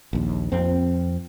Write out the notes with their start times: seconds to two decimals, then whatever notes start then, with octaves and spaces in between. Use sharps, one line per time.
0.13 A#1 D#2
0.52 F2 C4